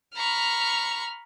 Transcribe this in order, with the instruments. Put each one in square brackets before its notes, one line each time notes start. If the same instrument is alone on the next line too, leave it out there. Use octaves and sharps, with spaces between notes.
[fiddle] A#5 C#6 [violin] B5 F6